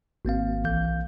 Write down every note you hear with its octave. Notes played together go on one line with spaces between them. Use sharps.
G#1 A#3 C4 F5
B1 E3 F5 G6